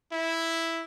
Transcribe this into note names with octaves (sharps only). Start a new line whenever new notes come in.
E4